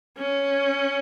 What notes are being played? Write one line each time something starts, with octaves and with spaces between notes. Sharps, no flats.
C#4